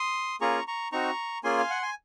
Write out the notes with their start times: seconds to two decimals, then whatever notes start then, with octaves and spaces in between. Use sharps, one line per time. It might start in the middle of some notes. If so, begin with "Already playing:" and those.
Already playing: C6 D#6
0.41 A#3 C#4 F4 G#4 A#5 C#6
0.67 A#5 C#6
0.92 C4 D#4 F#4 A#5 C#6
1.44 A#3 C#4 F4 G#4 G#5 C6
1.59 F5
1.70 F#5
1.82 G#5